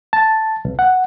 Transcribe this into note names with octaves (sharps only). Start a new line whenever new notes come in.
A5
C2
F#5